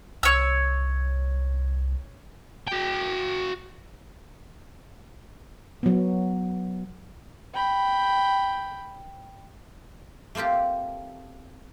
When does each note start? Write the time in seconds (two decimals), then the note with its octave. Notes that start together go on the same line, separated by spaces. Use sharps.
0.23 C2 C#5 E6
2.67 F#4 G5
5.83 F#3 B3
7.54 G5 B5
10.35 A3 A#3 C4 F4 G4